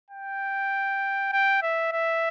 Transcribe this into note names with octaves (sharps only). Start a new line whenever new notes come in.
G5
G5
E5
E5